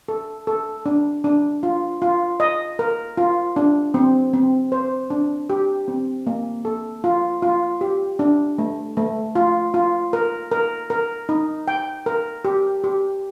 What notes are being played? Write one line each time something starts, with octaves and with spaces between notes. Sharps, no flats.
A4
A4
D4
D4
F4
F4
D#5
A#4
F4
D4
C4
C4
C5
D4
G4
C4
A#3
A4
F4
F4
G4
D4
A3
A3
F4
F4
A#4
A#4
A#4
D#4
G5
A#4
G4
G4